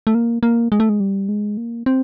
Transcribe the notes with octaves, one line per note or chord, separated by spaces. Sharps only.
A3
A#3
A#3
G#3
A3
G#3
G3
G#3
A#3
C4